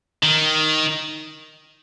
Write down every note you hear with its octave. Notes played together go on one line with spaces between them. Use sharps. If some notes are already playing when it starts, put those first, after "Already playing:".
D#3